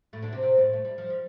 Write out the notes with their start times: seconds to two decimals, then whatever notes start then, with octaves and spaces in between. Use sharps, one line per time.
0.13 A2 A3
0.22 D3 D4
0.32 C3 C4
0.43 C3 C4
0.57 A2 A3
0.73 A3
0.85 G3
0.98 F3
1.10 G3